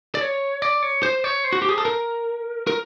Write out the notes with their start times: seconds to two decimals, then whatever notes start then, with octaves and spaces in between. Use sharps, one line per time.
0.15 D5
0.21 C#5
0.62 D5
0.82 C#5
1.03 C5
1.24 C#5
1.44 C5
1.53 F#4
1.62 G4
1.69 G#4
1.78 A4
1.85 A#4
2.67 A#4